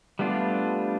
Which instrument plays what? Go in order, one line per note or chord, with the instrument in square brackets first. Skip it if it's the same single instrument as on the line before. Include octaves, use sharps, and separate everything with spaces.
[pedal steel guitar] G3 A3 B3 D4 F4